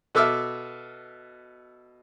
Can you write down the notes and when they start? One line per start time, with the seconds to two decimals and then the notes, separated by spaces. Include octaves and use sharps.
0.15 B2 A4 E5 D6 E6 F6